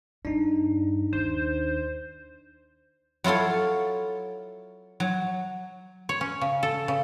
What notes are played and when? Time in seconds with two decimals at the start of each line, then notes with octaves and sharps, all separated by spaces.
0.25 G2 D4 D#4
1.13 D#2 C5
3.24 F#3 E4 F4 A4 C#5
5.00 F#3
6.09 C#5
6.21 C#4
6.41 C#3
6.63 A4
6.88 C#3